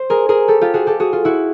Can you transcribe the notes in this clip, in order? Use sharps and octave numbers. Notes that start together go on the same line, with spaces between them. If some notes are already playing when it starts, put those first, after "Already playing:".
Already playing: C5
G#4 A#4
G#4 A#4
G4 A4
F4 G4
F#4 G#4
G4 A4
F#4 G#4
F4
E4 F#4